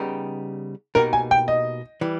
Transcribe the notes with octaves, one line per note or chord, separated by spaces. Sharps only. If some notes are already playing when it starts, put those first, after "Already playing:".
Already playing: C#3 G3 B3 D#4 G4
B2 A#3 D#4 G4 A#4
G#5
G5
D#5
E3 G3